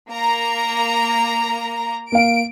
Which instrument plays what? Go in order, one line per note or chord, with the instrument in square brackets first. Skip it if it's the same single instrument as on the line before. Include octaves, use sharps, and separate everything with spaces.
[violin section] A#3 A#5
[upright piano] A#3 F5 [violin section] D7